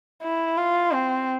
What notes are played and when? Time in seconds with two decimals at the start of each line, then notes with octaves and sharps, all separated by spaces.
0.23 E4
0.57 F4
0.92 C4